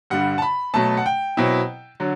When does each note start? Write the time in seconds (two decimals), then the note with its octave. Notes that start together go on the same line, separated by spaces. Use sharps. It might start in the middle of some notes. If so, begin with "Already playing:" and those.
0.10 G2 D3 G3 F#5
0.38 A5
0.42 B5
0.74 B2 F#3 A3 A5
0.97 F#5
1.06 G5
1.37 B2 F#3 C4 E4
2.00 D3 F#3